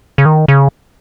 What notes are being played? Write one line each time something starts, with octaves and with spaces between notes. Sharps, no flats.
C#3
D#3
C#3